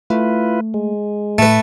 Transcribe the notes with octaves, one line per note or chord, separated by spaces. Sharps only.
A3 E4 F4 B4
G#3
A2 A3 B4